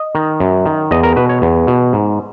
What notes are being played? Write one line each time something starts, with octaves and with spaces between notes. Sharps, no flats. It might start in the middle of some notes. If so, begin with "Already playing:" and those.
Already playing: D#5
D#3
F#2
D#3
E2 D#5
A#4
B2 B4
C#5
E2
B2
G#2